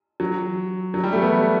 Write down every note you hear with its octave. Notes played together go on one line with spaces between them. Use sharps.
F#3
F#3
G3
A3
B3